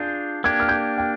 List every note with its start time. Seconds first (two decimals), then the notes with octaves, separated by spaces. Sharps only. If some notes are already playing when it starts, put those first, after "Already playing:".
Already playing: D4 F4 G#4 G6
0.44 A#3 D4 G4 G#6
0.60 F6
0.69 G6
0.98 G5